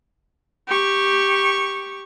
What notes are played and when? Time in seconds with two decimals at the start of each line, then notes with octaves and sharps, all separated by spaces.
0.68 G4 C#6